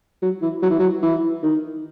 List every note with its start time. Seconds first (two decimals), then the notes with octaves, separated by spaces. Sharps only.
0.22 F#3
0.42 E3
0.62 F#3
0.70 E3
0.79 F#3
1.02 E3
1.43 D#3